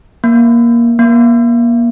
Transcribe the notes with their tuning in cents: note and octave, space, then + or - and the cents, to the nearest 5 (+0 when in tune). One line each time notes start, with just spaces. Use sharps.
A#3 +15
A#3 +30